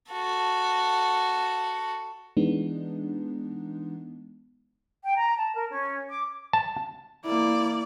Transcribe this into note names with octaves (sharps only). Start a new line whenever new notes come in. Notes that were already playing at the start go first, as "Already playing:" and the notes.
F#4 A4
E3 G#3 B3 D4 D#4
G5
A#5
A5
A#4
C#4
D6
A5
A#3 E4 D5